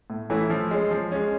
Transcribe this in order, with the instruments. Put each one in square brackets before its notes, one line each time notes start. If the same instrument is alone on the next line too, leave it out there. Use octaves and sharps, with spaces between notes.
[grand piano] A2
E3 A3 C#4 E4
F3
G#3 C#4
F3
G#3 C#4